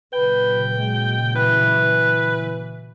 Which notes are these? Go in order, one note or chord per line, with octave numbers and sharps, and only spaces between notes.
A#2 C#3 F#3 B4 G5
G#3
E3 B4